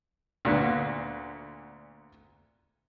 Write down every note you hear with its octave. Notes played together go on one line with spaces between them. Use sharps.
D2 A#2 D3 B3